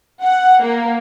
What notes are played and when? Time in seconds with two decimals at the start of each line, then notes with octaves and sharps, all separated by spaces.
0.23 F#5
0.62 A#3